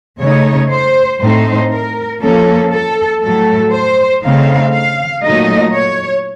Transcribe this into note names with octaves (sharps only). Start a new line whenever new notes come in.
C#3 A3 D#4 C#5
C5
A2 A3 C4 D#4 C5
A#4
F3 A#3 C#4 A4
A4
A2 F#3 A3 A4
C5
C#3 A3 C4 D#4 F5
F5
A#2 F#3 A3 D#4 D#5
C#5